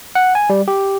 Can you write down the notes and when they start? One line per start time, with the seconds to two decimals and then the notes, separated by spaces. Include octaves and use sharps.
0.15 F#5
0.35 G#5
0.50 G3
0.68 G4